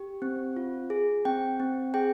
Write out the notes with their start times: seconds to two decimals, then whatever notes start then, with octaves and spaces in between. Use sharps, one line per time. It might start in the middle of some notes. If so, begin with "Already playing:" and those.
Already playing: G4
0.22 C4
0.56 F4
0.90 G#4
1.25 C4 G5
1.60 C4
1.94 G#4 G5